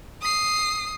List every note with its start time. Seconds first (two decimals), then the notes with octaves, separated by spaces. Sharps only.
0.22 D#6 C7